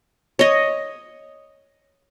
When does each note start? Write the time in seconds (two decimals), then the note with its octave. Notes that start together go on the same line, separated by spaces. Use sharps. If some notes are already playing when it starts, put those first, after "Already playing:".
0.39 C#5 D#5